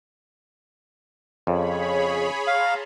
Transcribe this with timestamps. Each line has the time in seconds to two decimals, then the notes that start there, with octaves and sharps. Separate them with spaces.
1.47 F2 C#3 G#4 C#5 B5
2.47 F5 A5 A#5 C6